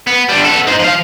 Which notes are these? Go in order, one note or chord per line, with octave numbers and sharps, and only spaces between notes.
B3
D3 G3
B3 A4
D#4 C5
F3 F5